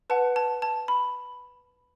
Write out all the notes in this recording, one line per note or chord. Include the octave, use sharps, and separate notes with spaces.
B4 F#5 A5
A5
A5
B5